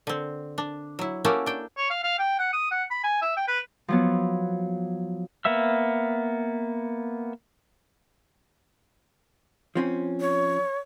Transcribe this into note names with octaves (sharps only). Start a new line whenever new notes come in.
D3 C4
D4
F#3 E4
A#3 C#4 E4 F#4 G4 A4
D4 G5
C#5
F5
F5
G5
F#5
D#6
F#5
B5
G#5
E5
G5
B4
F3 F#3 B3
A#3 B3 E5 E6
F3 C4 C#4
C#5